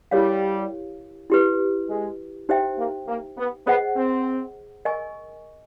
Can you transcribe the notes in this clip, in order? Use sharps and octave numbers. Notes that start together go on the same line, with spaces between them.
G3 E4 G4 A#4 C#5 F5
E4 G4 B4
G#3
D#4 G4 C5 E5 G5
A#3
A#3
B3
B3 G#4 C5 D#5 F#5
C4
A#4 D#5 G#5 C#6